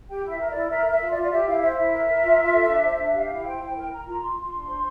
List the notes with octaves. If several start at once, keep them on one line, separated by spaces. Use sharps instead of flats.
G4 G5
E4 E5
A#4
E4 D5
A#4 E5
A#4
E5
F4
D5
F4
D5
G4 E5
E4 F5
C5 E5
E4 E5
A#4
A#4
F4
F4
A4
D4
C5
D4
G4 F5
E4
C5 G5
E4
A#4 G5
A#4 A#5
F4 A#5
F4 C6
F4
D4
C5